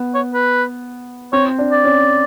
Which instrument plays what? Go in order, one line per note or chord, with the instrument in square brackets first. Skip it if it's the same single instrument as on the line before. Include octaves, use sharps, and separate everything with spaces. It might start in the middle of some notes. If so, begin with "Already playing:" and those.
Already playing: [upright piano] B3
[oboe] C#5
B4
[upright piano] C4 [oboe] C#5
[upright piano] D4
[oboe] D5
[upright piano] C#4